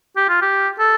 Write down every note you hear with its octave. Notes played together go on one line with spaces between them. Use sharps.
G4
F4
G4
A4